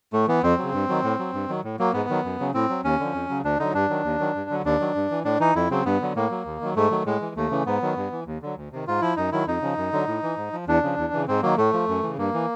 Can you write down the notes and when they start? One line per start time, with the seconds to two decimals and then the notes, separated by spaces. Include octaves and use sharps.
0.13 A2 A3
0.28 E3 B3
0.43 F2 C4
0.58 C#3 F#3
0.73 G2
0.89 D#3 F#3
1.04 A2
1.19 F#3
1.34 G2
1.48 D#3 F#3
1.64 A2
1.79 F#3 A#3
1.93 G#2 B3
2.09 D#3 F#3
2.25 F#2
2.40 C#3 F#3
2.54 A2 C4
2.69 F#3
2.84 D#2 C#4
2.99 D3 F3
3.14 F2
3.29 C#3 F#3
3.44 D2 D4
3.59 D3 F#3 D#4
3.74 G2 D4
3.90 D#3 F#3
4.04 D#2
4.20 D#3 F#3
4.35 G2
4.50 D3 F#3
4.65 D#2 D4
4.80 D#3 F#3
4.95 G2
5.11 E3
5.25 A2 D4
5.40 E3 D#4
5.56 F2 E4
5.70 C#3 F#3 C4
5.85 G2 B3
6.01 D3 F#3
6.16 A2 A#3
6.31 F#3
6.45 D#2
6.61 D#3 F#3
6.76 G#2 A3
6.91 D#3 F#3
7.06 A2 G#3
7.21 E3
7.36 D#2 A3
7.51 C#3 E3
7.66 G#2 B3
7.82 D#3 F#3
7.96 G2
8.12 E3
8.26 D#2
8.42 D3 F#3
8.57 D2
8.72 C3 D#3
8.87 G#2 F4
9.01 F3 E4
9.16 F#2 D#4
9.32 D#3 F#3 E4
9.47 F2 D#4
9.62 C#3 F3
9.77 F#2
9.93 D3 F#3
10.07 A2
10.23 E3
10.37 G#2
10.53 F3
10.67 E2 D4
10.83 C#3 F3
10.98 E2
11.13 C#3 E3
11.27 G#2 C4
11.42 D#3 F#3 A#3
11.58 A2 A3
11.73 F3
11.88 F#2
12.03 C#3 E3
12.18 G2 A#3
12.34 E3